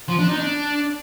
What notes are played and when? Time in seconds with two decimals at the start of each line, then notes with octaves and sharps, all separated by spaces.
0.08 F3
0.19 D4
0.29 D#4
0.39 D4